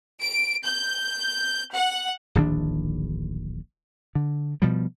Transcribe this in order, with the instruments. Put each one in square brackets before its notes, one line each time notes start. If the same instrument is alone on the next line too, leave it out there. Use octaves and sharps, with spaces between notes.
[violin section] D7
G6
F#5
[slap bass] D1 A#1 D#3 D4
D3
B2 F3 G3